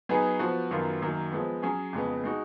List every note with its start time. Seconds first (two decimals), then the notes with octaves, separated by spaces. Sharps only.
0.09 F#3 B3 D#4 G#4 B4
0.39 F3 B3 F#4
0.71 F#2 D#3 F#3 B3 F4
1.02 F#2 D#3 F#3 A#3
1.32 F3 G#3 B3
1.62 F#3 C#4 G#4
1.93 F2 C#3 G#3 B3
2.24 G#3 D#4 F#4